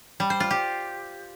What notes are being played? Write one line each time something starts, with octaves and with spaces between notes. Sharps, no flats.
G3
C5
F4
G4